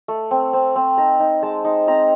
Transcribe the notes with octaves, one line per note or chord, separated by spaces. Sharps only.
A3
C4
C4
C4
D#4 A#5
D#4
G#3 A5
D#4
C4 A#5